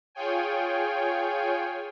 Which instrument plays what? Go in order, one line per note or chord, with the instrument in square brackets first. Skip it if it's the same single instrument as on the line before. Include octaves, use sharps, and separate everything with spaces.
[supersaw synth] F4 G#4 C#5 G5 G#5